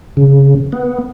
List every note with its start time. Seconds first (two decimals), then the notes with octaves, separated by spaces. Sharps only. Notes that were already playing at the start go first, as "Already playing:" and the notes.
0.17 C#3
0.72 B3